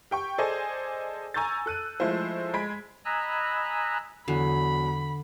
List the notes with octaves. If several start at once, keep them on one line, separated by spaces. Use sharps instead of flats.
G4 G5 C#6
G#4 A4 C5 D5 D#5 G#5
G#5 A#5 C#6 E6 G6 A6
A4 F#6 D#7
F3 G#3 A3 E4 C5
G#3 B5 G#6 B6 D7
D#5 G#5 A#5 B5 E6 F#6
E2 D3 F#3 B5 C7